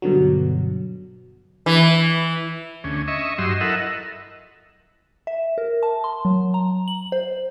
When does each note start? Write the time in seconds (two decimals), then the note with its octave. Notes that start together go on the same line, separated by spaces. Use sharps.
0.02 G2 B2 D3 F#3
1.66 E3
2.84 D2 C#4
3.08 D#5 E5 C#6
3.38 G2 F#3 D#5 C6 E6
3.61 E4 A4 A#4 D#5 E5 F#5
5.27 E5
5.58 A#4
5.83 A5
6.04 C6
6.25 F#3
6.54 A#5
6.88 F#7
7.12 C5